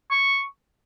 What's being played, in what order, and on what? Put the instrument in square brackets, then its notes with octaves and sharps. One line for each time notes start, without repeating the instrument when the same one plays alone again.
[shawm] C#6